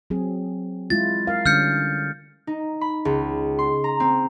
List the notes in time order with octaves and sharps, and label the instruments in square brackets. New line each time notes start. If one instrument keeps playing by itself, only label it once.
[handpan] F#3 C4 G#4
[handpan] G#3 E4 F4 [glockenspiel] A6
[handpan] A#4 F5
[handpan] D3 G3 C#4 [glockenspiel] F6 G6 C#7
[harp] D#4
B5
C#2
C6
A#5
C4